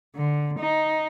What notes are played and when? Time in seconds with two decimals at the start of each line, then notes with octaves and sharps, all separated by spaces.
0.16 D3
0.59 D#4